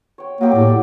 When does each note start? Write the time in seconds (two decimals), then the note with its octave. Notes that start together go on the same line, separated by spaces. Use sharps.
0.18 C#5 G5
0.41 F#3 A#3 G4 D6
0.54 A2 A4 D5 G5